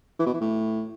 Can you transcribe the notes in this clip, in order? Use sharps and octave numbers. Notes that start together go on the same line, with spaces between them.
E3
B2
E3
A2